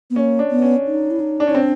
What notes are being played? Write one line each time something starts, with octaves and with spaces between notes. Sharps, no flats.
B3
A#3 C#4
D4
B3
C#4
D#4
E4
D#4
D4
C#4 D#4
C4 D4